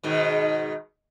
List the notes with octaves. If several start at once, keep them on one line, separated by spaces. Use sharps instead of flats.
G#2 B2 D#3